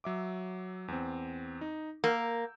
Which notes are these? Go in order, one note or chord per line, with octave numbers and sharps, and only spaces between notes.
F#3 E5 D6
E2 C4
D#4
A#3 E6 G6